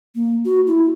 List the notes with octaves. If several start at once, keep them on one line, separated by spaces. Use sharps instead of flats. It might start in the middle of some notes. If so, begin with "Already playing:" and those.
A#3
F#4
E4